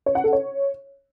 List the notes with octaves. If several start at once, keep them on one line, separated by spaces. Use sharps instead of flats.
C#5
F#5
A4
C#5